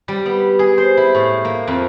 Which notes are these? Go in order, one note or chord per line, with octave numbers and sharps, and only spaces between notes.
G3
B3
G#4
C5
E4
A2
A#3
F2